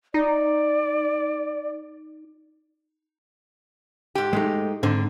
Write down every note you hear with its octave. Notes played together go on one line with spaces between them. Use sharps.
D#4 D5
G#2 G4
G#3 A3 D#4
G#2 D3 C4